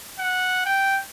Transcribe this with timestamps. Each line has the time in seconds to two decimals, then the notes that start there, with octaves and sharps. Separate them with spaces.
0.19 F#5
0.65 G5